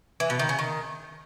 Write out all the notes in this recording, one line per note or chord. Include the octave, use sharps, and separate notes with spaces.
E3
B2
D#3
C#3
D#3